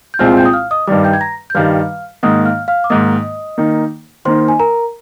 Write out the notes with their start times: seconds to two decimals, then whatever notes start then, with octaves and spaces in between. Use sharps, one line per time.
0.14 G6
0.19 C2 A#2 G#3 C4 F4 F5 F6
0.37 G5 G6
0.45 D#6
0.53 F5 F6
0.71 D#5 D#6
0.87 G2 D#3 G3 D5 D6
1.04 G5 G6
1.13 G#6
1.21 A#5 A#6
1.50 G6
1.55 G2 D#3 G3 F5 F6
2.23 G#2 D#3 A#3 D#5 D#6
2.45 F5 F6
2.68 F5 F6
2.84 D6
2.90 G#2 D#3 A#3 D#5 D#6
3.58 D#3 A#3 D#4
4.25 D#3 A#3 D#4 C5 C6
4.48 G#5
4.60 A#4 A#5